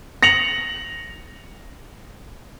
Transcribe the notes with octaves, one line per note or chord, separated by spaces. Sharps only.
A#6 C#7 F7 F#7